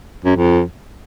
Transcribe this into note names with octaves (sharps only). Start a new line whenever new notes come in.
F#2
F2